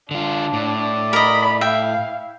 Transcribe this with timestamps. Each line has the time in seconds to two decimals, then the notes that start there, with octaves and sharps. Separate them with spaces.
0.11 D3 D4 F4
0.53 A2 D5
1.13 A#4 D#5 B5
1.61 E4 E5 F5 G5